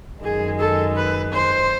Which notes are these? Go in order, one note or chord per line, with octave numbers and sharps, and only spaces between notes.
F#2 D#3 G#3 G#4
A4
B4
C5